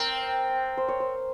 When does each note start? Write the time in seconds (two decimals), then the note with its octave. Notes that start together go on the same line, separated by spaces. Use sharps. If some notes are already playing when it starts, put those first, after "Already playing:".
Already playing: C4 A#4
0.77 C5
0.88 C#5
1.00 C5